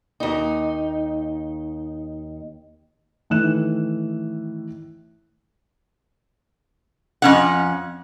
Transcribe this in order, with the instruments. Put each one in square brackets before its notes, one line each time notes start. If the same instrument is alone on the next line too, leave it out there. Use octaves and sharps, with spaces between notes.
[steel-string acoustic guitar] D#2 D#4
[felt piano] A2 D#3 E3 F#6 E7
[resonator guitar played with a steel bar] F2 C#4 F#5